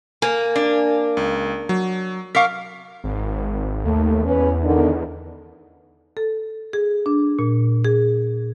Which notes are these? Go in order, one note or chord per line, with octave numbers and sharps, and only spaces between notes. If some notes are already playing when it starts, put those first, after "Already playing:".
A#3 G#5
D4
C#2
F#3
A#4 F5 C#6 D6 B6
G#1
D#2 A3
E2 C#4 B4
D3 D#3
A4
G#4
D4
A#2
G#4